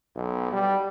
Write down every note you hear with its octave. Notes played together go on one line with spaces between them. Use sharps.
B1
G3